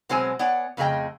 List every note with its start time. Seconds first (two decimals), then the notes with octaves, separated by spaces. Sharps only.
0.09 B2 F#3 G#3 C4 C5 G#5
0.39 B3 C#5 D5 F#5 G#5
0.77 F2 C#3 A3 G#4 D#5 G5